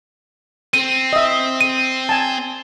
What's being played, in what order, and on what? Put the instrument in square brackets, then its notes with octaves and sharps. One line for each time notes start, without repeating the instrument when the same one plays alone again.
[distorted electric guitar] C4 [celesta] D#7
[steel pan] D#5 E5
[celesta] D#7
[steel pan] G#5 A5